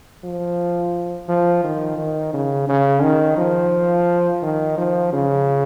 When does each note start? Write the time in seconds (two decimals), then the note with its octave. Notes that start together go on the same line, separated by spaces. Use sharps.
0.24 F3
1.29 F3
1.64 D#3
1.98 D#3
2.34 C#3
2.69 C#3
3.03 D#3
3.38 F3
4.42 D#3
4.78 F3
5.13 C#3